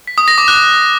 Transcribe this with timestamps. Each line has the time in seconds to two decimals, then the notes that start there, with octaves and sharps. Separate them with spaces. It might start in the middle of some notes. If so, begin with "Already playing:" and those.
0.07 B6
0.18 D#6
0.28 A#6
0.38 D6
0.48 F#6